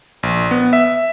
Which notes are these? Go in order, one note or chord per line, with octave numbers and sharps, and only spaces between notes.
A#1
B3
E5